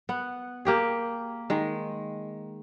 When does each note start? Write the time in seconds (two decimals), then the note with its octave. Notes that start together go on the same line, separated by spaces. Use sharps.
0.09 B3 F#5
0.65 A#3 G4 G#4
1.50 D#3 G#3